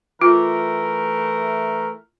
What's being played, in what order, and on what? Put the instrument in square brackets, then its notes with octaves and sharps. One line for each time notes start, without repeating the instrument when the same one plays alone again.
[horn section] E3 A3 A#4 [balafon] F4